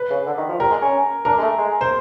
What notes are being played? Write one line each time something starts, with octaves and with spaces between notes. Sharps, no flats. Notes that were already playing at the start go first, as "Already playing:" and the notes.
Already playing: B4
C#3
D3
D#3
F3
G3 A#4
G#3
C#4
D4 A#4
G#3
A3
G#3
C5